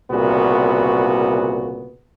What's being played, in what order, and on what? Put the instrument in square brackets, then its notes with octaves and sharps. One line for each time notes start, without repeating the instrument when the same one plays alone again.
[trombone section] C2 A#2 C#3 B3 F#4